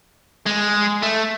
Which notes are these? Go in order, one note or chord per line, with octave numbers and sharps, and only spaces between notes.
G#3
A3